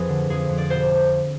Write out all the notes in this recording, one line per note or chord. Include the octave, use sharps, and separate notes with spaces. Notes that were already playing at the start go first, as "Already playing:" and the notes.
Already playing: F2 F3 G#4 B4
D3
F2 G#4
F2
D5
B2 C5